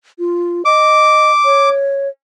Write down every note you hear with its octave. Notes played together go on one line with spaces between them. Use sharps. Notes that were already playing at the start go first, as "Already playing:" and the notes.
F4
D#5 D6
C#5